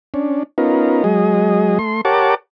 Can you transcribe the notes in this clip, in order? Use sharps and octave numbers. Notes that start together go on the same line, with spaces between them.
C#4 D4
B3 C#4 D#4 F4 A#4
F#3 G#3 G#4 D#5
A3 C6
G4 A#4 C#5 F#5 A5 D6